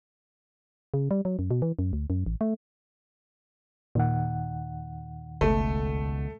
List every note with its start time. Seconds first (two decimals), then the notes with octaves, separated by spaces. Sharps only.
0.94 C#3
1.11 G3
1.25 F#3
1.39 F#2
1.51 B2
1.62 E3
1.79 F#2
1.93 D2
2.10 F#2
2.26 A1
2.41 A3
3.95 D#2 A#2 D#3 F#5
5.41 G1 C#2 B2 A3 A4